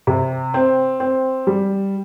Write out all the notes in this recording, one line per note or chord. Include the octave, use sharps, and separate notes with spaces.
C3
C4
C4
G3